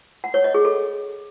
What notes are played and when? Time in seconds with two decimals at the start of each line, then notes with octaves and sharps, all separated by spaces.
0.24 F#5
0.34 C#5
0.44 D#5
0.54 G#4
0.65 A4